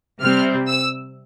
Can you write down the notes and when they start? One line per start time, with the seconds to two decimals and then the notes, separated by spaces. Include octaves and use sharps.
0.21 C3 G3 C4 F6
0.69 E6